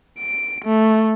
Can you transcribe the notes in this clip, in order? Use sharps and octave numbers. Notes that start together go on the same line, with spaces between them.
D7
A3